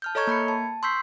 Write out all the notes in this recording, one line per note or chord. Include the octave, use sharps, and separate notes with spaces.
A5 F6 G6
A4 C#5 D#5 A#5 C#6 G#6
A#3 B5 G#6 C#7
A5
C6 C#6 E6 G6 B6 C7